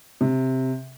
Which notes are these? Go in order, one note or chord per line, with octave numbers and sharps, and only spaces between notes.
C3